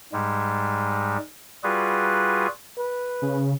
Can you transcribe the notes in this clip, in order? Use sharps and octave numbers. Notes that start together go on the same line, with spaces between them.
G#2 G3 G#3
G3 F4 F#4 G#4 B4
B4
C#3